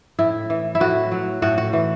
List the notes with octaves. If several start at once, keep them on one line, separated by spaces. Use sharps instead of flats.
A2 E4
E3
E4
A2 F#4
F#3
A2 F#4
F#4
E3